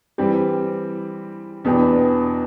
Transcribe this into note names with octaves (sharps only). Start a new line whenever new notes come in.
E3 G3 C4 G4
E2 B2 B3 D4 G4